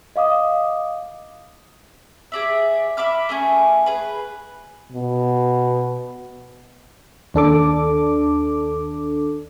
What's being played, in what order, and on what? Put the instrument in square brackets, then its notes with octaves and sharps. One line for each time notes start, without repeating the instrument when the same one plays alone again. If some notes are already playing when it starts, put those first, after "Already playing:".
[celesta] D#5 F5 D6 D#6
[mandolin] G#4 D5 E5
E5 B5 D6 F6
A3 C#4 G#4
G#4 B4
[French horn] B2
[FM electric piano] D#2 D4 A4 D6